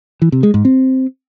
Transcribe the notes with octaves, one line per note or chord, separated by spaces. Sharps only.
E3
C3
G#3
G#2
C4